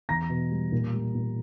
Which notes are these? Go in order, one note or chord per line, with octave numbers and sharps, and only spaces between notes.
E2 A#5 A#6
B2
G3
A#2
G3
A#2